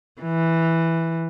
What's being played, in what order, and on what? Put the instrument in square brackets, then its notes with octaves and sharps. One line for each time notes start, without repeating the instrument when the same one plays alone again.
[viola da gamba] E3